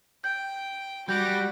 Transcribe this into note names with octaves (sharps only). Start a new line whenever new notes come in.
G5 G6
G3 F#4 G4 F#5 D6 G6 A#6